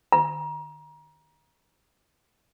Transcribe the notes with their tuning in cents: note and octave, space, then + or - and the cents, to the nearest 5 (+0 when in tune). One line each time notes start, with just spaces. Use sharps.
A#5 +30